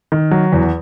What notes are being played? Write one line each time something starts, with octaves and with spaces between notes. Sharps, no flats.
D#3
F#3
E2